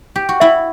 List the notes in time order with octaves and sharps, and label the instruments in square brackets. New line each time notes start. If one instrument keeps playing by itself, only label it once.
[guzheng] G4
F#4
[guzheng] E4 [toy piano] E5